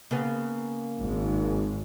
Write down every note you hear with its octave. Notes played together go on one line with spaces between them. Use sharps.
C#3 A#3 B3
G#1 G#2